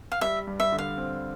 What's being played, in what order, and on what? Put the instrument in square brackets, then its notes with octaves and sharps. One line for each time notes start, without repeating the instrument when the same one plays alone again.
[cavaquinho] F5
[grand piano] G3 [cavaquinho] E5
[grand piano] G2
[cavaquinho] E5
[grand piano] D3
[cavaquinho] F5
[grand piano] C4